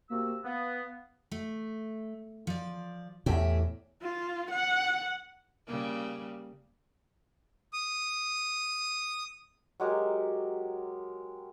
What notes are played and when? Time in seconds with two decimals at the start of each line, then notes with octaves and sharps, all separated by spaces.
0.10 C3 A#3 F#4 E6
0.44 B3 F5
1.32 A3
2.47 F3 D5
3.26 E2 A2 G4 G#4 E5
4.02 F4
4.51 F#5
5.67 C#3 G3 A#3
7.73 D#6
9.80 F#3 G#3 G4 A#4